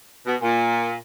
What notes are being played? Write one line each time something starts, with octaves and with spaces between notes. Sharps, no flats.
B2
A#2